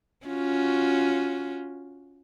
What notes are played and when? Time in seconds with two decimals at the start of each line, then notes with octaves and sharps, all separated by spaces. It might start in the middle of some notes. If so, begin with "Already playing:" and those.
0.26 C#4 F4 F#4